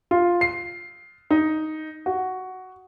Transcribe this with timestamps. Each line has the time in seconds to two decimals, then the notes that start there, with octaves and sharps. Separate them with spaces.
0.11 F4
0.41 C7
1.30 D#4
2.06 F#4